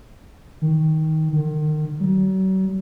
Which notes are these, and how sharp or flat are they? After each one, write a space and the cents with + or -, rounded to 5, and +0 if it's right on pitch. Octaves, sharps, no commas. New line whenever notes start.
D#3 +15
D#3 -35
F#3 +40